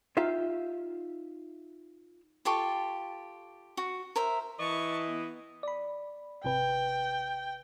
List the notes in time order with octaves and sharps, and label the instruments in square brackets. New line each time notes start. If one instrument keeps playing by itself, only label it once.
[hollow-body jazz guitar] D#4 F4 G4 E5 F5
[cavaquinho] F4 G4 A4 C#6
F#4
A#4 C5 E5
[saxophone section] E3 [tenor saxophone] D#5 [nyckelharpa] A5 C#6
[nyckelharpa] B3
[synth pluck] D5 B5
[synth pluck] G#1 C3 B4 [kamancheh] G5